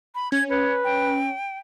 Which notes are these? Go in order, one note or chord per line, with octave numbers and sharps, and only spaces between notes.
B5
C#4 G#6
B4 C#5
G5